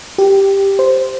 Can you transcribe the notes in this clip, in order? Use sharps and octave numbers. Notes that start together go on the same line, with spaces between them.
G4
C5